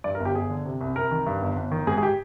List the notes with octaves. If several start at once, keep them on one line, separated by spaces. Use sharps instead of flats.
G2 D5
A#4
G1
G4
G1 G#4
D3
C3
C2
C2 A#4
D#3
G2
G1
G1
D#3
G#2 G#4
G#4
G4